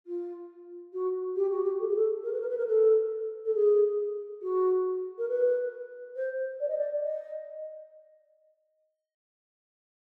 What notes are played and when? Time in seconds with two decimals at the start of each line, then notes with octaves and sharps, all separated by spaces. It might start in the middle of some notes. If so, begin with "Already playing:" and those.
0.06 F4
0.93 F#4
1.35 G4
1.50 F#4
1.64 G4
1.79 A4
1.87 G#4
1.95 A4
2.23 A#4
2.32 B4
2.40 A#4
2.48 B4
2.57 A#4
2.67 A4
3.45 A4
3.54 G#4
4.41 F#4
5.18 A#4
5.28 B4
6.15 C5
6.59 D5
6.68 D#5
6.77 D5
7.02 D#5